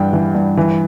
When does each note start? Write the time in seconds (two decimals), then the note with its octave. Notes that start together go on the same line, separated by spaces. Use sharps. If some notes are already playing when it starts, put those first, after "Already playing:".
Already playing: G2 E3 F#5 G5
0.13 E3
0.35 G2
0.57 E3